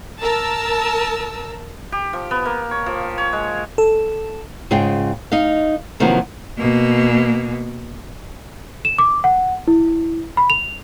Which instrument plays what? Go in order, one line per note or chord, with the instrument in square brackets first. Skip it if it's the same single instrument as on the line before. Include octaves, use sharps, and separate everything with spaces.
[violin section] A#4 A5 E6
[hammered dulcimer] G4
F3
B3
A#3
C#5
F3
C#5
G#3
[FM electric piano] A4
[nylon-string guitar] G#2 C#3 F4 G#4 G5
D#4 D#5 F5
C3 D#3 F3 F#3 A#3 B3
[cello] B2 A#3
[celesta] E7
D6
F#5
E4
B5
F7